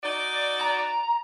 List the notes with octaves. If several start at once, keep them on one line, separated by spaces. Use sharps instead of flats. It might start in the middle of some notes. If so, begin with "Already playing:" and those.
D#4 F#4 D5
A#5